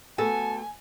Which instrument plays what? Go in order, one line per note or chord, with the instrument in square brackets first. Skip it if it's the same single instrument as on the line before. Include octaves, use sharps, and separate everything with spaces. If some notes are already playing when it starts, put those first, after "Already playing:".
[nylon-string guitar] A3 B3 F#4 [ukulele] A4 [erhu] G#5